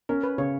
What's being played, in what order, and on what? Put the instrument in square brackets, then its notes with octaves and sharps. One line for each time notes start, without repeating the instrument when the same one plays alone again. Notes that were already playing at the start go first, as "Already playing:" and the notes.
[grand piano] C#4 [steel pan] A#4
[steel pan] B4
[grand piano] C#3 [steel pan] C#5